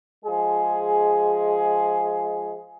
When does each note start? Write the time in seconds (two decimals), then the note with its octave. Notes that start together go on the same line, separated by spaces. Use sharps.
0.25 F3 G#3 G#4